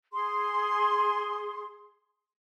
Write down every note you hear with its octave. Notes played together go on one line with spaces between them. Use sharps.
G#4 C6